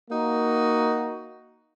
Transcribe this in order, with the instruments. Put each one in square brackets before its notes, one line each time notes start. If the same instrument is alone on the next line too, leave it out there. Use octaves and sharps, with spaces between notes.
[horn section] A#3 D#4 F#4